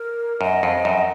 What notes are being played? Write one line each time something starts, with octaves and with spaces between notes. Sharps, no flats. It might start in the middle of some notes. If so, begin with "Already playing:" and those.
Already playing: A#4
F#2 D#5
F2
F#2